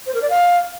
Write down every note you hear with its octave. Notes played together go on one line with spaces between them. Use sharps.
C5
A#4
D5
F5